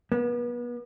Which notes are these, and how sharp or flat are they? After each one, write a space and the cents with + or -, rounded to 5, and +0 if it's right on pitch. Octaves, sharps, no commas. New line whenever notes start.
B3 -35